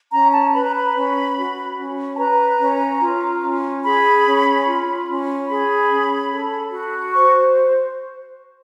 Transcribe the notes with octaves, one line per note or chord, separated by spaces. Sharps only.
C#4 A#5
A5
B4 B5
A#5
B5
C#4
F#4
C#4
A5
B4 A#5
C#4
F4
C#4
G#4 B5
C#4
F4
C#4
G#4 B5
C#4
A4
F#4
C5 C#6